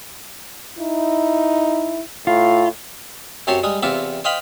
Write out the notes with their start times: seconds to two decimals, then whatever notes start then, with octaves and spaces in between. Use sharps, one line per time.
0.79 D#4 E4
2.27 A2 F4
3.47 F#2 C4 G4 C#5 A5 C6
3.63 G3 G#3 D#6
3.83 E2 C3 C4 F4 E5 D6
4.24 C5 D#5 F5 G5 B5